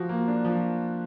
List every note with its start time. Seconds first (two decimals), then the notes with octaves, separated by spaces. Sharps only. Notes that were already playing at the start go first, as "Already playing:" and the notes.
Already playing: F3 F#4
0.09 A#3
0.28 D4
0.45 F3